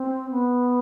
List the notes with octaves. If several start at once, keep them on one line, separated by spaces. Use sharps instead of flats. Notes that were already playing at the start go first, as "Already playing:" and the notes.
Already playing: C4
B3